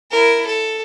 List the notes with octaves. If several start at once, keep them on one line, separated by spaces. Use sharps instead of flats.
E4 A#4
A4